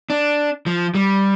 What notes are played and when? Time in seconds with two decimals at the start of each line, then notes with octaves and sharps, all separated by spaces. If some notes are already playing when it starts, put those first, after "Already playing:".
0.10 D4
0.66 F3
0.95 G3